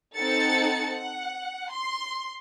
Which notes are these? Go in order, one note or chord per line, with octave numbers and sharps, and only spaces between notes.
C4 D#4 A4 F#5 A6 C#7
F#5
C6